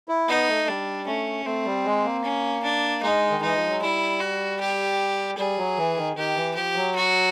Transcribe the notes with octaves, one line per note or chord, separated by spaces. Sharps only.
E4
B3 D#4
A3
G3 D4
A3 C#4
A3 C4
G3
G#3
A#3
C#4
D4
G#3 D#4
D#3
E3 D#4
F3
F#3
G3 E4
F#4
G4
G3 G#4
F#3
E3
D#3
D#3 G4
E3
F3 G4
F#3
F#4